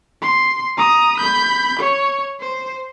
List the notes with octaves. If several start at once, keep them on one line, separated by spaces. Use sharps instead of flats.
C6
A#5 D#6
B5 G6
C#5
C5